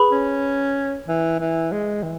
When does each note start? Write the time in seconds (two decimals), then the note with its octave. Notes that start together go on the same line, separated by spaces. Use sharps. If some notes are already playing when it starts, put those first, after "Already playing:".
Already playing: G#4 B4 B5
0.12 C#4
1.08 E3
1.40 E3
1.72 G#3
2.03 E3